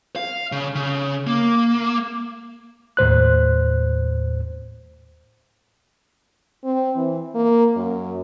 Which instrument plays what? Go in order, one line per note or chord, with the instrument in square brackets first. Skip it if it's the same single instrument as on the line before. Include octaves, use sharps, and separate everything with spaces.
[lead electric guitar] F5
C#3
C#3
A#3
[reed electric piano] D#2 A2 C5 F#6
[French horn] C4
E3
A#3
F#2